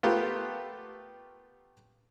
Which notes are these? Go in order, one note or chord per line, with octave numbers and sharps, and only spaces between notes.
A3 B3 F4 G4 A#4